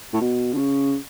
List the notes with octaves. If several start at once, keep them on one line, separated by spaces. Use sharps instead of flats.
A2
B2
D3
C#3